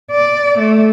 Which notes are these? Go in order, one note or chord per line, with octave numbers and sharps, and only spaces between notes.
D5
A3